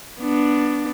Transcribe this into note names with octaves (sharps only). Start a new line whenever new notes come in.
B3 D4